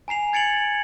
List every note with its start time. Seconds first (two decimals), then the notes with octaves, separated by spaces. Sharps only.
0.08 G#5 A#5 C7 F7
0.33 G#6 A6 C#7 D7 F7 F#7